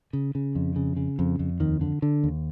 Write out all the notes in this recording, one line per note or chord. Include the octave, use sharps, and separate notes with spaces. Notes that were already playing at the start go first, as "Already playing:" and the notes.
C#3
C#3
F2
C#3
C#3
F2
F2
D#2 D#3
D3
D3
D#2